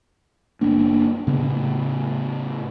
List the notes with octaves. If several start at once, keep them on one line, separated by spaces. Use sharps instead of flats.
F#1 A#3 B3 D4
A2 C#3 B3